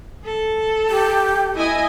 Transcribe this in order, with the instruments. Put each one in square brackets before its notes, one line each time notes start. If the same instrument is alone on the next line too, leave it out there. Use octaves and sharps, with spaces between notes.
[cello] A4
[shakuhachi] G4
[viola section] E4 D#5 G#5